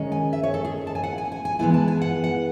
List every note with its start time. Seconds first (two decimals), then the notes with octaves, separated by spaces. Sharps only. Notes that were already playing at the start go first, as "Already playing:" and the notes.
Already playing: D#3 G#3 C#4
0.12 G#5
0.33 E5
0.43 C#5
0.54 A4
0.65 G#4
0.87 A5
0.95 G#5
1.04 F#5
1.18 G#5
1.32 G#5
1.45 G#5
1.59 E3 G#3 B3 E4 G#5
1.74 A5
1.88 G#5
2.01 F#5
2.24 F#5